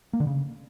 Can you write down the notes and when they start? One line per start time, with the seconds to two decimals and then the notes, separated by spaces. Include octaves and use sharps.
0.13 A#3
0.20 D3
0.27 C#3